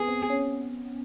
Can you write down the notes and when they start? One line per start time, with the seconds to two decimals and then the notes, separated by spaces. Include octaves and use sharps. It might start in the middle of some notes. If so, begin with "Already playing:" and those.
Already playing: B3 G#4
0.08 C4
0.30 C#4